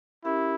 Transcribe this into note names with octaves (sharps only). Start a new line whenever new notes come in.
C#4 E4 G4 A#4 E5